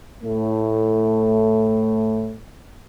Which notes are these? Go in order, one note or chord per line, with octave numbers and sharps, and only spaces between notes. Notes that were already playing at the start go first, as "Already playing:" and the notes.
A2 A3